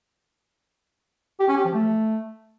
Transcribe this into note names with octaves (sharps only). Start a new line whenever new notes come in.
G4
C#4
G4
F3
A3